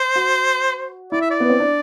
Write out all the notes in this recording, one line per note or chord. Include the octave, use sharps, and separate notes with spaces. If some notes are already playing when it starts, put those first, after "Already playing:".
Already playing: C5
F#4
E4 D5
E5
D5
B3
C4
D4